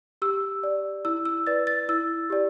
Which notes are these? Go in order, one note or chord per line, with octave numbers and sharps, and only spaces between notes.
G4 E6
D5
E4 E6
E6
B4 D5 A6
A6
E4 E6
G4 D5